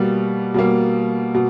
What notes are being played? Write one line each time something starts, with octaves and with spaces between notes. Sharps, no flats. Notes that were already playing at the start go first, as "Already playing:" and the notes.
Already playing: B2 G3 A#3
B2 G3 A#3
B2